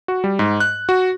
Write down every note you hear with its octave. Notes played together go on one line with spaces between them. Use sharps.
F#4
G3
G#2
F#6
F#4